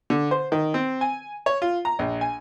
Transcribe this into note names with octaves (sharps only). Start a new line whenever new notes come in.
D3
C5
D#3
C4
G#5
C#5
F4
A#5
A#1
G#5